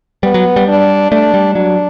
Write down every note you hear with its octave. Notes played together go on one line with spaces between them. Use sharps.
G3 B3
F#3
G3
D4
A3 D4
G3
F#3 D4